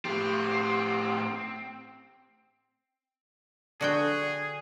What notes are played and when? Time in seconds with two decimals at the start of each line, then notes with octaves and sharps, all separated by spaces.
0.05 A2 C4 G4
3.81 D3 F#4 G#4 G5